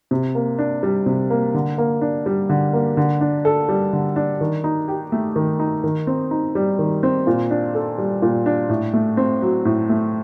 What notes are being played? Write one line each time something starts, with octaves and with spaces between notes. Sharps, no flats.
C3
A#3
D4
G3
C3
A#3
D3
A#3
D4
G3
D3
A#3
D3
D4
A4
G3
D3
D4
D#3
D#4
G4
A3
D#3
D#4
D#3
C4
D#4
G3
D#3
C4
A#2
D4
A4
G3
A#2
D4
A2
A3
C4
F#3
A2
A3